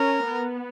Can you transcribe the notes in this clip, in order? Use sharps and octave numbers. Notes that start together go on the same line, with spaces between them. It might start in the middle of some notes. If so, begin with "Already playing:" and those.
Already playing: C#4 A#4
B3